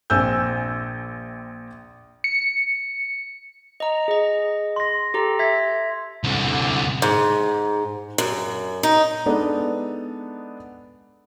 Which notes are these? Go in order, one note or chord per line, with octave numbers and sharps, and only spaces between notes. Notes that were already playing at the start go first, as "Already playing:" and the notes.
A#1 C4 G#5 E6 G6
C#7
D#5 A#5
G#4 D#5
C6 A#6
G4 A4 A#5
E5 G#6 B6
C2 D3
G#2
F#2
D#4
G#3 B3 D4 D#4 A4